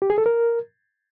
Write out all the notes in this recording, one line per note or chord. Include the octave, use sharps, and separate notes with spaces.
G4
G#4
A4
A#4